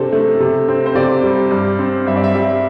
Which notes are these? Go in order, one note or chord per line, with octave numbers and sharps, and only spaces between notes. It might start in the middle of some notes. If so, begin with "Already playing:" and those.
Already playing: C3 D4 A4 C5
A3
C3
C4
C5
C3 D5
G3
G2
C4
G2 E5
D5
E5
G3